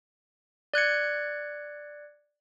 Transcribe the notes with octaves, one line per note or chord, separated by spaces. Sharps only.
D5 F#6 G#6 C#7